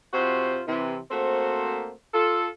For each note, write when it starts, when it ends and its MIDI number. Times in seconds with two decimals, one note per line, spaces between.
0.13 0.61 48
0.13 0.61 65
0.13 0.61 66
0.13 0.61 72
0.67 0.97 48
0.67 0.97 52
1.10 1.90 57
1.10 1.90 58
1.10 1.90 60
1.10 1.90 66
1.10 1.90 72
2.14 2.47 65
2.14 2.47 69